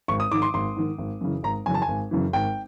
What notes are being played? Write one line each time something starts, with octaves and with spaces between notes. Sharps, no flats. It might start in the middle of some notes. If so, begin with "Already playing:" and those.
G#1 C#6
D#6
G#2 D#3 D6
C6
G#1 C6
G#2 D#3
G#1
F#2 C#3 E3
G#1 A#5
F#2 C#3 E3 G#5
A5
G#5
G#1
F#2 C#3 E3
G#1 G5